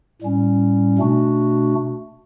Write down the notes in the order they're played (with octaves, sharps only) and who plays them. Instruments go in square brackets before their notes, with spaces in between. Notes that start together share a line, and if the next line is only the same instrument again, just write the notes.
[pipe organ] A2 G3 C#4
B2 A3 D4 F#4